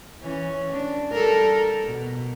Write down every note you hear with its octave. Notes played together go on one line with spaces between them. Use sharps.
E3 C#4
D4
G3 A4 A#4
B2